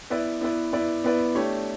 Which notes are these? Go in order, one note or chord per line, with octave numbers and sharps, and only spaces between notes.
B3 E4 B4 D5
B3 E4 B4 D5
B3 E4 B4 D5
B3 E4 B4 D5
A3 D4 G4 C#5